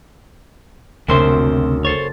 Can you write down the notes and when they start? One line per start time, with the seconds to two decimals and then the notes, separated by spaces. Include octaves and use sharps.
1.08 F#1 D2 C3 C4 C5 E5 C6
1.85 A4 C5 C#5 A6